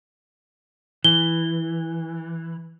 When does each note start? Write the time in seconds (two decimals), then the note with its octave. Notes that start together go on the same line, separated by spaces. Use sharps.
1.04 E3 G7